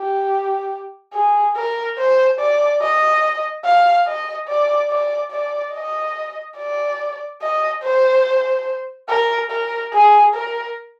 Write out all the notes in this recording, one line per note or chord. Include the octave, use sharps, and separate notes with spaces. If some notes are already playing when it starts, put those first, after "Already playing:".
Already playing: G4
G#4
A#4
C5
D5
D#5
F5
D#5
D5
D5
D5
D#5
D5
D#5
C5
A#4
A#4
G#4
A#4